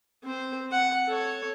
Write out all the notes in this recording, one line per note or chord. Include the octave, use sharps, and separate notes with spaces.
C4 C5
F#5
A4 C#5